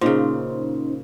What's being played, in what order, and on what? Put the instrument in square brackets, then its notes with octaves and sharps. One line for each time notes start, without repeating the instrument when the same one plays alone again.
[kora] A#2 C#3 [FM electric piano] C#4 D#4 C5